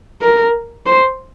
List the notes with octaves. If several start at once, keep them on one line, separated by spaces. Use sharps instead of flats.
A#4
C5